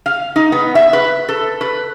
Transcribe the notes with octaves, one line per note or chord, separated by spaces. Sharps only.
F5
D#4
B3
E5
B4
A4
B4